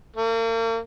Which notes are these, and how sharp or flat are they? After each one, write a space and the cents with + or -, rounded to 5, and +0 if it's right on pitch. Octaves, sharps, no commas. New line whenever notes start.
A#3 -40